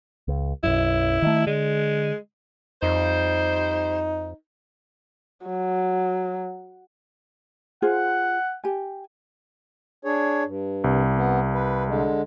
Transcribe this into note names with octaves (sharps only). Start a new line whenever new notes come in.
C#2
B1 F#2 E4
D#3 A3
D3 G#3
F2 G3 D#4 C5
F#3
F4 G#4 C5 F#5
G4 G#5
D4 G#4 C#5
G2
C2
B3
B4
D3 G#3